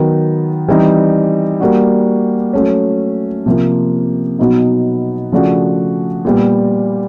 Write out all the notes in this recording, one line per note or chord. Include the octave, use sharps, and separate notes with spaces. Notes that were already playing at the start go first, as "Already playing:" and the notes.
Already playing: D#3 F#3 B3
E3 G3 C4 D#4
G3 A#3 D4 F#4
F#3 A3 C#4
C3 F3 A#3
B2 F#3 B3 D#4
C#3 F3 A3 D4 F#4
A#2 G3 B3